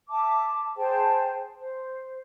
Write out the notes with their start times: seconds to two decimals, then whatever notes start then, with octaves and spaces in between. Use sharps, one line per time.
0.10 E5 A5 D6
0.77 G#4 C5 G5 A5
1.56 C5